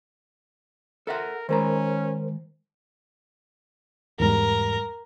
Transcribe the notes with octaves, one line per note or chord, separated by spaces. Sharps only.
A4 A#4 E5 F#5
D#3 G#3 C#4 A#4 C5 A#5
E2 G#2 G3 A#4